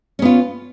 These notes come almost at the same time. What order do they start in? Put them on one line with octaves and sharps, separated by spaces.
C#4 B3 F4